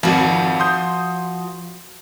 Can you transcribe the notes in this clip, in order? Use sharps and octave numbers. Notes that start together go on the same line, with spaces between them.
G#1 F2 F3 F#4
C6 D#6 G6